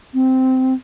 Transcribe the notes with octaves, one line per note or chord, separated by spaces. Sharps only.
C4